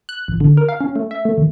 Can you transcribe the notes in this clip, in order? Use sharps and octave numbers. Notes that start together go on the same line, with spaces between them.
F#6
A1
D3
A#4
F5
C#4
A3
E5
A3
D#2